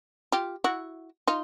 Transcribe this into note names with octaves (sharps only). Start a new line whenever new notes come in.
F4 G4
E4 F#4
D#4 F4